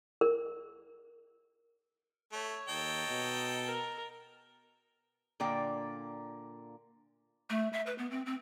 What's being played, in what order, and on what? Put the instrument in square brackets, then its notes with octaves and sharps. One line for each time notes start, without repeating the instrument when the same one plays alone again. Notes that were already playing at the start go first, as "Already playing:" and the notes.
[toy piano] A#4
[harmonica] A3 [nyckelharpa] C#5
[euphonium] D#2 [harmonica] D#4 A4 G5
[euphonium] B2
[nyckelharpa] A#4
[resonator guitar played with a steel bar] A#2 D3 A#3 D5 G5
[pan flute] A3
E5
B4
B3
C4
C4